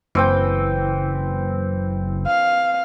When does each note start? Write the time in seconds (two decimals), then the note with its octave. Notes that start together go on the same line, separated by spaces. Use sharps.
0.15 F#1 E3 C4 G5
2.27 F5